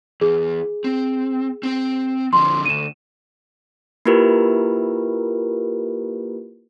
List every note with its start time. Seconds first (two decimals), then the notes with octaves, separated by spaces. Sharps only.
0.21 E2 G#4
0.84 C4
1.63 C4 C6
2.33 F2 D3 C6
2.65 D2 D#7 E7
4.05 A#3 E4 F4 G4 A#4 B4